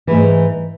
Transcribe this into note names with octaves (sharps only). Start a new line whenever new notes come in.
G#2 E3 A3